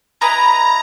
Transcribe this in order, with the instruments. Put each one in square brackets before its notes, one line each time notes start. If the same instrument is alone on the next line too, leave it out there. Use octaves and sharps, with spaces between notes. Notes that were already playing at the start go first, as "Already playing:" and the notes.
[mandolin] E4 B4 D#5 G#5 [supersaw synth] A#5